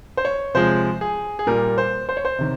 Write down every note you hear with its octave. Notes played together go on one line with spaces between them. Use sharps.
C5
C#5
C3 F3 G#3 C5
G#4
G#4
A#2 G3 A#4
C5
C5
C#5
C5
C3 D#3